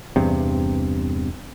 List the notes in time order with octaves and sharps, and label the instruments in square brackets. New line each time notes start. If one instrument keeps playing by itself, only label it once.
[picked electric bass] E2 G2 C3